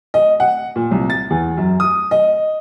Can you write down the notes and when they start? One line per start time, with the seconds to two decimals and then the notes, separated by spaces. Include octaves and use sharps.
0.14 D#5
0.40 F#5
0.76 A#2
0.91 C2
1.10 A6
1.30 E2
1.57 F#2
1.80 D#6
2.11 D#5